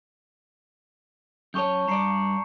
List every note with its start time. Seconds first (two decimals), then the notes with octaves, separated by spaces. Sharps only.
1.54 F#2 G4 C#5 A5 C#6 G6
1.88 G2 D5 A#5 C7 C#7